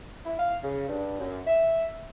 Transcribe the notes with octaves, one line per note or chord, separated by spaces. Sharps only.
E4
F5
C#3
G2
F#2
E5